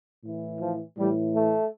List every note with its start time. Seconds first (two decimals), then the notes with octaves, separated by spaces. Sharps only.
0.24 A2 E3
0.60 F3
0.97 A2 E3 G3
1.34 A3